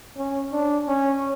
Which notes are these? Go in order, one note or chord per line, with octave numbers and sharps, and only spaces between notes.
C#4
D4
C#4